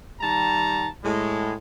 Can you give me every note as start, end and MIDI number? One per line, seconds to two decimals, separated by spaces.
0.21 0.87 51
0.21 0.87 55
0.21 0.87 81
0.21 0.87 82
1.04 1.53 45
1.04 1.53 56